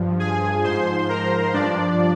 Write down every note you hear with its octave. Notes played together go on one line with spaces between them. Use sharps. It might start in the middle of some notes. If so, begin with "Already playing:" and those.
Already playing: G2 F3
G#4 G#5
G#2 F3 C5 C6
A#4 A#5
G2 F3 D4 D5